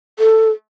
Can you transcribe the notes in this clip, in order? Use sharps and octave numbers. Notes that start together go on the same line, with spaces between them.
A4